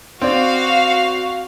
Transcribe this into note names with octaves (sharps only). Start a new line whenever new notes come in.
C4 F#4 D5 F5